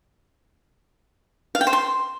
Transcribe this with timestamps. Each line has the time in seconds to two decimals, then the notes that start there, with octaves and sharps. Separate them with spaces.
1.55 F5
1.61 G5
1.67 C5
1.73 C6